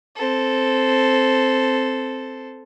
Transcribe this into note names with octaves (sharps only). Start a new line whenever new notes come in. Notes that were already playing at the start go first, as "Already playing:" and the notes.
C4 A4